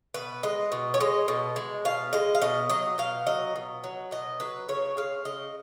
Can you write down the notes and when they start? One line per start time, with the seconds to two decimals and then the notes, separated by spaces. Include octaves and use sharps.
0.14 B2 B4
0.43 G#3 D#5
0.72 B2
0.94 C#5
1.00 G#3 D#5
1.28 B2
1.56 G#3
1.85 B2 F5
2.13 G#3 D#5
2.35 F5
2.41 B2 D#5
2.70 F#3 D#5
2.98 B2 F5
3.26 F#3 D#5
3.56 B2
3.84 F#3
4.11 B2 D#5
4.40 F#3 B4
4.69 C#3 C#5
4.97 G#3 F5
5.25 C#3 D#5